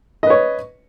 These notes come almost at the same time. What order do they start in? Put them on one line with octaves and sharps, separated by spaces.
D#5 B4 C#5